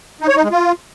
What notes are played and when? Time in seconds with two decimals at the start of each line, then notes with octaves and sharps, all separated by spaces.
0.21 D#4
0.28 C#5
0.36 D#4
0.44 G#3
0.51 F4